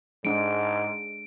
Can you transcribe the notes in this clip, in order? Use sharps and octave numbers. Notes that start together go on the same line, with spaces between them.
G#2 G#3 D4 D7